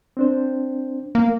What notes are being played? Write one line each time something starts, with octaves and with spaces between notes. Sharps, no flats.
C4 D4 C5
A#3